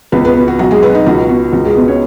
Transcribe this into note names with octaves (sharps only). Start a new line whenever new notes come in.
C#2 B3 B4
B3 B4
B2
F#4
B1 F#4
G#3 G#4
B2 B3 B4
D#4
C#2 F#4
B2 F#4
C#2 F#4
G#3 G#4
B2 B3 B4
C#4 C#5